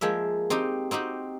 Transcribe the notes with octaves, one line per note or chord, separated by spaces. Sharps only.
F3 G#3 A#3 E5
C4 D#4 G4
C4 D#4 F#4 G4